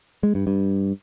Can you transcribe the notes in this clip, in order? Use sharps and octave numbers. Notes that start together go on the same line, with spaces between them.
G#3
G2
G2